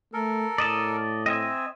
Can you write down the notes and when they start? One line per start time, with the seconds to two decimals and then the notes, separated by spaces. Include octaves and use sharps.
0.14 A3 A4 A#4
0.58 A2 D5 D#5 A5
1.26 C4 D#5 E5 G#5